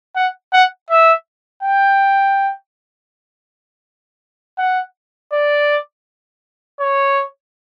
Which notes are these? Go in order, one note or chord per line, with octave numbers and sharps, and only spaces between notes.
F#5
F#5
E5
G5
F#5
D5
C#5